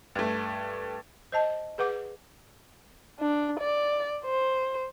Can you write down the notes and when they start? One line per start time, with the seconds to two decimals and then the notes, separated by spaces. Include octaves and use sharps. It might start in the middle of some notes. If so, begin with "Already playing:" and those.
0.15 G2 A3
1.32 C5 D#5 A5
1.78 G#4 B4 F#5 D6
3.20 D4
3.60 D5
4.25 C5